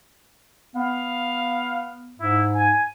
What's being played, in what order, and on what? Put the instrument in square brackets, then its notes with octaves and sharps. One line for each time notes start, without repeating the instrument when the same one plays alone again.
[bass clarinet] B3 [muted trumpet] F5
[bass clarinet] G#2 [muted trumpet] E4
[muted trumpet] G#5